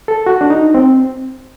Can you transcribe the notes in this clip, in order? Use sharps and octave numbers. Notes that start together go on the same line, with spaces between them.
A4
F#4
D4
D#4
C4